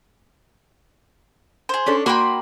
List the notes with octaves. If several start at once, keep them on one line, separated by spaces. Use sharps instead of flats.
G#4 C5
C#4 D4 A4
A#3 F#4 A#4 G5 B5 C6